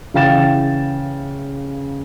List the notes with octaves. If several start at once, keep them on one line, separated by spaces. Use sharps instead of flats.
C#3 E3 F5 G5 A6 E7